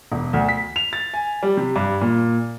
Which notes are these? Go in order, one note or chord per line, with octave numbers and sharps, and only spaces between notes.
E1
D2
B6
F7
A6
G#5
G3
C3
G2
A#2